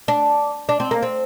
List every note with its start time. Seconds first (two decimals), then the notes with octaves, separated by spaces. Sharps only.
0.08 D4
0.69 D4
0.80 C4
0.91 A#3
1.02 C4